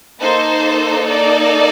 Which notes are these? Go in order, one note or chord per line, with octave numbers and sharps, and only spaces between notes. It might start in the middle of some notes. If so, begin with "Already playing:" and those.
A#3 D#4 A4 C5
D5